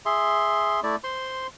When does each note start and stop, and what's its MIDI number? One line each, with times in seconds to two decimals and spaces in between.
0.05 0.80 68
0.05 0.80 76
0.05 0.80 84
0.83 0.96 57
0.83 0.96 64
0.83 0.96 74
1.04 1.47 72
1.04 1.47 84